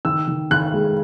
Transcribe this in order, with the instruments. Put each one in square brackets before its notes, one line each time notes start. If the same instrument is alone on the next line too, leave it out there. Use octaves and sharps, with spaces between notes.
[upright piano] D#3 E6
D#3
D#3 F#6
G#3